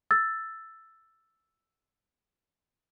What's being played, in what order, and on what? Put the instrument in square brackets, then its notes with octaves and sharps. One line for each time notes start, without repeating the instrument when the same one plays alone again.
[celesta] E6 A6